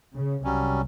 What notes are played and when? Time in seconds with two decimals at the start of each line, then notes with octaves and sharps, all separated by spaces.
0.14 C#3
0.44 C2 F#3 G3 C#4